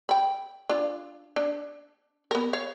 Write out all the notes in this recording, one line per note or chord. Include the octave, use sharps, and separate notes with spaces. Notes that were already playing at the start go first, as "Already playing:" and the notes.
G5 B5
D4 F4
D4
B3 A#4
C#5 F5